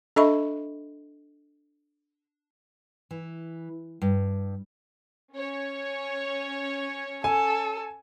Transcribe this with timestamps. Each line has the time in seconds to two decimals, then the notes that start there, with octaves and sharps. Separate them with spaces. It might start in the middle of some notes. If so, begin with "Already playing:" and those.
0.16 D4 A4 D#5 E5 B5 C#6
3.11 E3
4.02 G2
5.33 C#4 C#5
7.24 A4 G#5